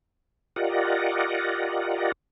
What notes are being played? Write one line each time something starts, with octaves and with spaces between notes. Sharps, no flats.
F4 G4 A#4 D5 D#5 F#5